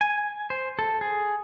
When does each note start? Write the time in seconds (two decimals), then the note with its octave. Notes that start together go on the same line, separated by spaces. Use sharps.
0.01 G#5
0.50 C5
0.79 A4
1.01 G#4